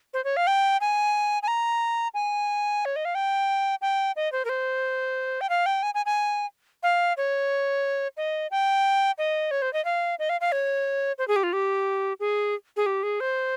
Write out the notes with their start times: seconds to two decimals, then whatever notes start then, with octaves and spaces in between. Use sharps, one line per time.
0.14 C5
0.24 C#5
0.37 F5
0.47 G5
0.81 G#5
1.43 G#5
1.48 A#5
2.14 G#5
2.85 C#5
2.96 D#5
3.05 F5
3.15 G5
3.82 G5
4.16 D#5
4.32 C5
4.45 A#4
4.49 C5
5.41 G5
5.50 F5
5.66 G5
5.83 G#5
5.94 G#5
6.06 G#5
6.83 F5
7.17 C#5
8.17 D#5
8.51 G5
9.18 D#5
9.51 C#5
9.62 C5
9.73 D#5
9.85 F5
10.19 D#5
10.29 F5
10.41 F5
10.52 C#5
11.18 C5
11.28 G#4
11.36 G4
11.43 F4
11.53 G4
12.20 G#4
12.77 G#4
12.86 G4
13.03 G#4
13.20 C5